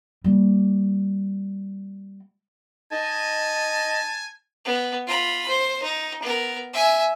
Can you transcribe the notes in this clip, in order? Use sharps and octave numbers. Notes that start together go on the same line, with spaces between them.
G3 A#3
D#4 D#5 G#5 A5
B3
F4 B5
C5
D#4
B3 A#4
E5 G#5